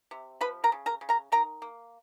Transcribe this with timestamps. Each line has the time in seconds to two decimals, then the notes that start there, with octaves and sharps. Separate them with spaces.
0.11 C3
0.41 F3 B4 B5
0.64 A#4 A#5
0.72 C#3
0.86 A#4 A#5
1.01 C#3
1.09 A#4 A#5
1.32 D#3 A#4 A#5
1.62 A#3